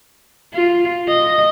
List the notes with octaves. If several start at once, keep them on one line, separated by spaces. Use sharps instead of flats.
F4
D#5